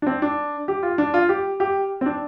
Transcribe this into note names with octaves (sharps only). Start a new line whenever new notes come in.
D4
C4
D4
G4
F4
D4
F4
G4
G4
C4
D4